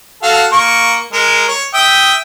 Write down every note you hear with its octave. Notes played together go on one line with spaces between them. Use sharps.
F#4 A4 F5
A#3 C#6
G#3 A#4
C#5
E5 G5 D#6